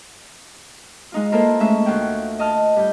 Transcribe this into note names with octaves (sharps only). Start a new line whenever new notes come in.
G#3 D#4 F4
A#3 E4 F4 A4 A#4 C5
G#3 A3 C#4 E5
D2 F4 F#5 G5
D#5 A5 F6
G2 G6